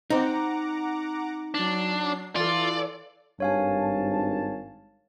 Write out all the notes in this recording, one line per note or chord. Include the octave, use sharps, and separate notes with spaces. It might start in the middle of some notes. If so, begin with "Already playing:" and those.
C4 D#4 F#5 A#5 D6
F#3 D4 C7
E3 F4 A4 D5
G#1 G2 C#5 F5 G#5 A5